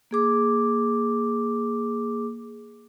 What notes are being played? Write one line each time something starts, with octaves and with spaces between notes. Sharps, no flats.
A#3 G#4 D6